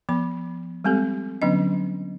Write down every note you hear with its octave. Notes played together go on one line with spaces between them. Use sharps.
F3 B3 B5
G3 G#3 C4 G4 A4
D3 F#3 B3 C#4 D4 D#5